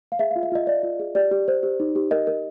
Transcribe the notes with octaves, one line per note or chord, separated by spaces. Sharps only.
F5
G#4 E5
F5
F4
E5
F4 D#5
F4 D5
F4
G#4
G4 D5
G4
C5
G4
D#4
G4
A#4 D#5
A#4